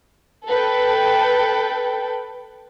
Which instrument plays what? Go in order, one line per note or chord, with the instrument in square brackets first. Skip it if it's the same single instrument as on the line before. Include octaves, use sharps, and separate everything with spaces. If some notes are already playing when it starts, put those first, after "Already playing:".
[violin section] A4 B4 G5